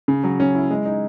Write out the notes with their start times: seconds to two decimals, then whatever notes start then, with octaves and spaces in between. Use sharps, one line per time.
0.08 C#3
0.24 F#3
0.40 C#4
0.55 E4
0.71 G#3
0.85 D#4